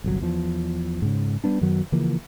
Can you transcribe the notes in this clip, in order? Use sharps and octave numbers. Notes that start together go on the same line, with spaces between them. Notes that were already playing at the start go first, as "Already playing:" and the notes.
G1 C2 F#3
E2 F3
G#2 C#3
G3 B3 D4
F#2 D#3 F#3 B3
C#3 E3 F3 A#3